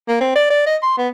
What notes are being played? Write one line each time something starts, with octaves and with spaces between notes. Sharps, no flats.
A#3
C4
D5
D5
D#5
C6
B3